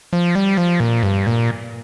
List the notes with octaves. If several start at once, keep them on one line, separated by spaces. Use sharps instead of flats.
F3
G3
F3
A#2
G2
A#2